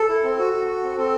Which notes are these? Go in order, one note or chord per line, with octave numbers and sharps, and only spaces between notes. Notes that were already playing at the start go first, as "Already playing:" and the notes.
Already playing: A4
E4
C4
F#4
F#4
F#4
C4
C4 A4